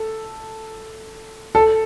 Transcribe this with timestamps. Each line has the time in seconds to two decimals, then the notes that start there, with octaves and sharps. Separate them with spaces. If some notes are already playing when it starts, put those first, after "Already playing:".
Already playing: A4
1.55 A4